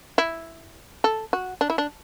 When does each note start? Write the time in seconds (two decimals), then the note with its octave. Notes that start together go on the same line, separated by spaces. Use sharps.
0.18 E4
1.04 A4
1.33 F#4
1.61 D4
1.70 E4
1.78 D4